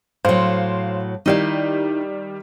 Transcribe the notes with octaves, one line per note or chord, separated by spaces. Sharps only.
A2 F#3 C5 F5 C6
D#3 G3 D#4 E4 F5